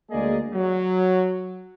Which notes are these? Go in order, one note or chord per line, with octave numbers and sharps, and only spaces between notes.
D2 G#3 A#3 G#4 D5 D#5
F#3